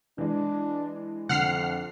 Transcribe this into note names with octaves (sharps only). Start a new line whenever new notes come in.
E3 G#3 D4
F2 D3 F#5 F6 C7